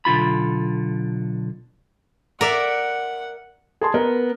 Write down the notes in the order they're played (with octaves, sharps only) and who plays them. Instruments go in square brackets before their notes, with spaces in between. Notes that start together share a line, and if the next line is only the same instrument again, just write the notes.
[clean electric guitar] B1 D3 F4 B5
[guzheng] A#4 D5 E5 [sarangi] F#5
[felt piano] G#4 A5 C6
[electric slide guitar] B3 [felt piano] A#4